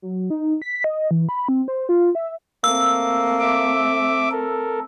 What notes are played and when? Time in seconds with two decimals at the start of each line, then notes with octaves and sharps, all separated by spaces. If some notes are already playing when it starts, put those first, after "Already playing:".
0.02 F#3
0.30 D#4
0.62 B6
0.84 D#5
1.11 E3
1.29 B5
1.49 C4
1.68 C5
1.89 F4
2.15 E5
2.64 A3 A#3 C4 E6
3.40 E5 D6
4.31 A4 A#4